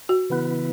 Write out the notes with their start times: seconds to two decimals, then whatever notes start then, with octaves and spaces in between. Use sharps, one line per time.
0.09 F#4
0.30 C#3 E3 B3 E4 B4